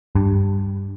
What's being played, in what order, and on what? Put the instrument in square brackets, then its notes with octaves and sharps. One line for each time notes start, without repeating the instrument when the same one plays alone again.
[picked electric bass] G2